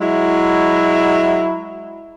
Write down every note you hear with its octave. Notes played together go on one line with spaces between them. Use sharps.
F#3 G#3 E4